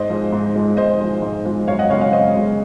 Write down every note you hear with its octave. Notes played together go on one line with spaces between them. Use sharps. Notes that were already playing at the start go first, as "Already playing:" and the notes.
Already playing: G#2 C5 D#5
F3 G#3
G#2
F3 G#3
G#2 C5 D#5
F3 G#3
G#2
F3 G#3
F#2 C#5 F5
D#5 F#5
C#3 G#3 C#5 F5
C#5 F5
F#2 C5 D#5
C#3 G#3